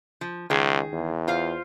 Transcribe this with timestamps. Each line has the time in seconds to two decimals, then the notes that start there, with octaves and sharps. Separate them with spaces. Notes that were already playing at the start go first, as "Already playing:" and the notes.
0.21 F3
0.50 C#2 D#3 G#4
0.93 E2
1.28 F4 C5 F5